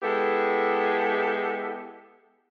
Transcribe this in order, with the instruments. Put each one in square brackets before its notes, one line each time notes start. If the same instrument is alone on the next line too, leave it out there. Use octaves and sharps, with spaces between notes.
[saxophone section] G#3 B3 E4 G4 A4